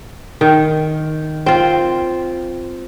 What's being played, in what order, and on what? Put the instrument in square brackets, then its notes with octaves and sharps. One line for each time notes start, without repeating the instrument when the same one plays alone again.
[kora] D#3
C4 F4